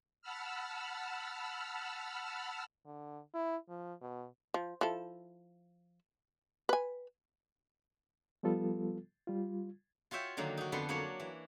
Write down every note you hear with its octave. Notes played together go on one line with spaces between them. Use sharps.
F#5 A5 B5 E6 F6
D3
E4
F3
B2
F3
F3 E4 A4
B4 G#5
F3 G3 B3 F4 A4
G3 F4
F4 F#4 C#5 E5 G5
D3 D#3 F#3 A#3 A#5
D#4 F#4
F2 D3 B3 A4 B4 C6
F#3 A#3 D4 C#5
E3